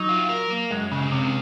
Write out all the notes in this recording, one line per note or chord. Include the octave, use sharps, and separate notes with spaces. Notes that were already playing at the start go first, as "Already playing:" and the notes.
Already playing: F#3 D#4
F4
A#4
A#3
F#2 G#3
C#3 G#3
C3 C#4